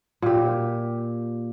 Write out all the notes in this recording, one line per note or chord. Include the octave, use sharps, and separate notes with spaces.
A#2 G4